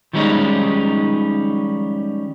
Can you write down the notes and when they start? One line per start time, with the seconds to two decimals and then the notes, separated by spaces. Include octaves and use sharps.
0.13 D#3 F3 G3 G#3 C#4 D#4